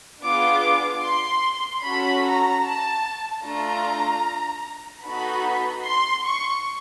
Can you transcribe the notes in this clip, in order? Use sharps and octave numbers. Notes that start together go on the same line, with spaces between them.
B3 D4 F4 G#4 D6
C6
C#4 F#4 A4 B5
A#5
A5
A3 D4 F4 A4 A#5
B3 D#4 F#4 A4 B5
C6
C#6